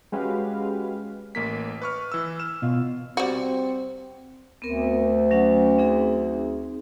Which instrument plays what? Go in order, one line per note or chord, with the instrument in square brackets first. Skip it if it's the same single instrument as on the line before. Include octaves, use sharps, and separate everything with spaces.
[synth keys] G#3 C#4 F#4 G4 B4 F5
[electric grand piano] A1 A#3 B6
B4 C#6 F6
E3 E6
F6 E7
[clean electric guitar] B2 F4
[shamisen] G3 F#4 [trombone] C4
[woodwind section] D2 [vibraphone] B3 C4 A#4
[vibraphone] F#3 C#4 F#5
C4 D#4 G#4